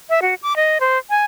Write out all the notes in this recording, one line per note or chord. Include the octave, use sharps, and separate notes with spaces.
E5
F#4
D6
D#5
C5
G#5